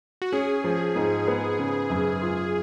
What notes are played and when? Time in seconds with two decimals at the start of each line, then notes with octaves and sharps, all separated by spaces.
0.22 F#4
0.32 C#4 G#4
0.64 F3
0.96 G#2
1.28 B3
1.59 C#3
1.90 F#2
2.22 F4